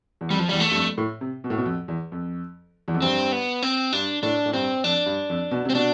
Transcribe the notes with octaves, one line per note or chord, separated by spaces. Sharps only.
E2
F2 G3
F3
E2 G3
A3
G2
F2
A2
C3
B2
A2
B2
F2
E2
F2
E2
F2
G2 C4
B3
C4
G2 D4
A2 D4
A2
G2 C4
F2 D4
G2
F2
B2
C3 C4
B2 D4